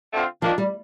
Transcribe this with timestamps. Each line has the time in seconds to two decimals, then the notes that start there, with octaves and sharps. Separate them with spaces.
0.12 D3 A3 C4 F4
0.42 D#3 F3 A#3 D4
0.58 G3